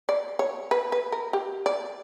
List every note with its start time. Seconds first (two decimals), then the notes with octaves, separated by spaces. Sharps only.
0.09 D5
0.39 C#5
0.71 B4
0.92 B4
1.12 A#4
1.33 G4
1.66 D5